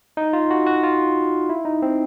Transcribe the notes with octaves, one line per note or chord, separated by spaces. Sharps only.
D#4
F4
F#4
F#4
F4
E4
D#4
C4